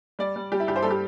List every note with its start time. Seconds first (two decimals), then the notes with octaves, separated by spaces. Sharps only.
0.19 G3 D5
0.36 G3
0.52 G3 G4
0.60 E4
0.67 G2 G4
0.76 C5
0.82 G3 A4
0.90 G4